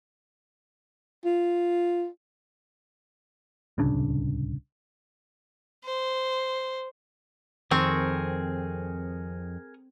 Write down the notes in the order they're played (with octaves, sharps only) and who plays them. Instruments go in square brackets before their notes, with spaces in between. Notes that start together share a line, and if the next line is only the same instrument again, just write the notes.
[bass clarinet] F4
[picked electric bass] D1 C2 C#3 D4
[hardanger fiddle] C5
[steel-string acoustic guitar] F2 [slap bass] D#3 [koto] C4 [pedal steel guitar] G#4 A#4 C#6